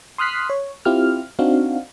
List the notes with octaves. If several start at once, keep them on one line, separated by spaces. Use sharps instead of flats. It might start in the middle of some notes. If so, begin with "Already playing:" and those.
C6 D#6 F6 F#6 B6 C7
C#5
C4 E4 F4 G4 F6
C4 D4 D#4 F#4 F5